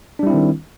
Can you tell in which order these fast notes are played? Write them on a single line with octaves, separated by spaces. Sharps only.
D4 G3 E4 C4 D#3